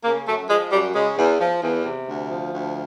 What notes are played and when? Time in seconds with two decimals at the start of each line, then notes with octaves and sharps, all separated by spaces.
0.04 C#3 A#3
0.28 F#2 A3
0.49 F3 G#3
0.72 F#2 G3
0.95 C#3 G#3
1.18 E2
1.41 F3
1.62 E2
1.85 C3
2.08 D2
2.30 F3
2.52 D2